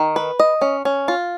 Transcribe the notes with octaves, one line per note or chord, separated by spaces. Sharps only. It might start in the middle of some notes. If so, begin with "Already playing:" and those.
Already playing: D#3
B4
D#5
C#4
C#4
F4